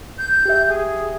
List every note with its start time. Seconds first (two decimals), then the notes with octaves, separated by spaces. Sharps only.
0.18 G6
0.45 G4 E5
0.68 G#4